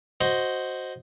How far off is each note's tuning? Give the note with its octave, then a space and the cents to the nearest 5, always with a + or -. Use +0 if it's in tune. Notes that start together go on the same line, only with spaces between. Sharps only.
F#4 +0 C5 +0 D#5 +0